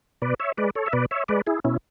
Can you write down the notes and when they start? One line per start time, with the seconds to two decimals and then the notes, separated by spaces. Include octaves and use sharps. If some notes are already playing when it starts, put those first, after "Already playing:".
0.22 B2 B4 D5
0.40 C#5 E5
0.57 G#3 B4 D5
0.75 A4 C#5
0.86 E5
0.93 B2 B4 D5
1.11 C#5 E5
1.28 G#3 B4 D5
1.47 E4 G#4
1.64 B2 C#4 E4